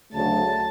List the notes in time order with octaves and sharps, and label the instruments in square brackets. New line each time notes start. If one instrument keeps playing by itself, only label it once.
[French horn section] D2 C#3 F#3 A3 [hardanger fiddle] A5